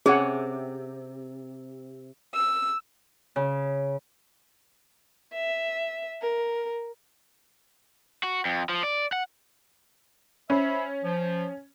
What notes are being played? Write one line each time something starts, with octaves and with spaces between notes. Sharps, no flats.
C3 C#4 G#4 C#5 F#5
E6
C#3
E5
A#4
F#4
F2
F3
D5
F#5
C#4 C5 E5 B5
F3